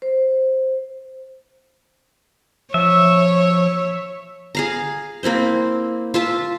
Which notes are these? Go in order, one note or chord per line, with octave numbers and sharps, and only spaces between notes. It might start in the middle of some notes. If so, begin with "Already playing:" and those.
C5
F3 C#5 E5
G#4 F5 A#5
A#3 C4 E4 C5
F4 E5 A5